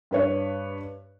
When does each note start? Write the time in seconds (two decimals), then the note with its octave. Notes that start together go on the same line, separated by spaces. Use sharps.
0.11 G2 B4 C#5